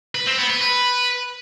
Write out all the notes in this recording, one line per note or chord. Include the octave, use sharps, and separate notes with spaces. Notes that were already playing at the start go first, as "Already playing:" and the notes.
B4
C4
B3
B4
B4